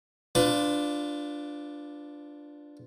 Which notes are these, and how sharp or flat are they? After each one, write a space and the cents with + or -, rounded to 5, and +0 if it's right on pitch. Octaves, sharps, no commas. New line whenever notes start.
D4 +0 F4 +0 B4 +30